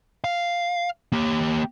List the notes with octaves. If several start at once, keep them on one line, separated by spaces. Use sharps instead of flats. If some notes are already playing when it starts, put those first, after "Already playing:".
F5
A#3 G4